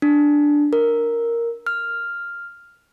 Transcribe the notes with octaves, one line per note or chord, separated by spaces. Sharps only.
D4
A#4
F6